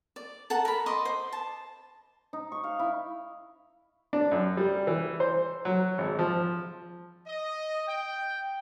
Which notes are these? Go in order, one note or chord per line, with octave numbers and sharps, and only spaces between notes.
D5
A4 F#5 A5 A#5
A#4 B5
D#5 C6 D6 D#6
C5
A5
D#4
C#6
F5
E4
D4
F#2
G3
E3
C5
F#3
G#1
F3
D#5
G5